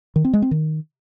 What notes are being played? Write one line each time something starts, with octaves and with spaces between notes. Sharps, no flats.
D#3
C4
G#3
C4
D#3